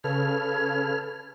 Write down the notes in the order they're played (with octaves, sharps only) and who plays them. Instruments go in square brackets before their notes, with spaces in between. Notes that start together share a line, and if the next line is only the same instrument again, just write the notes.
[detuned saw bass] C#3 [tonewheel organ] A4 B4 F6 [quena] G#6